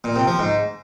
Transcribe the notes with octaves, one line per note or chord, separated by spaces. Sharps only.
A#2
C3
F3
G#2